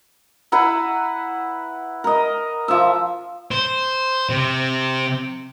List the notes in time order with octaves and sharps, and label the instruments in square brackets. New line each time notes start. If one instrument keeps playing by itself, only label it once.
[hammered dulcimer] E4 B4 F#5 A#5
A#4 D#5
F3 E5
[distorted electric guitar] C5
C3